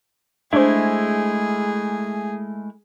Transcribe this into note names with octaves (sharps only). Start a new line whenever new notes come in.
G#3 A3 D4 E4 G#4 C5